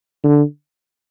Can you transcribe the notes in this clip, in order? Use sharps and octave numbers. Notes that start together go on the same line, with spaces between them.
D3